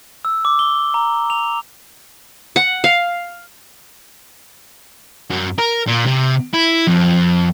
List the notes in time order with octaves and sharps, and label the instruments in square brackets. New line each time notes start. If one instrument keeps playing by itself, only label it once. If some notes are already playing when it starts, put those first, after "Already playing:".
[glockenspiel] E6
D6
G7
A#5
F7
[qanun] F#5
F5
[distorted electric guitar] F#2
A#4
A#2
C3
E4
F2